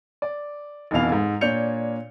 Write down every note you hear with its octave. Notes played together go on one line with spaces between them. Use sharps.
D5
F1 F2 B2 E3 F5 F7
G#2
A#2 D4 C#5 G6 C#7 F7